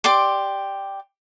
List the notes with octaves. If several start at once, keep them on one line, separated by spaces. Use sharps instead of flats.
G4 D5 C6 D6